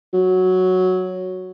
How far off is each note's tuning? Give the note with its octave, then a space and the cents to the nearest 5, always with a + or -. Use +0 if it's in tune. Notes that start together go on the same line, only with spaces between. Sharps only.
F#3 +0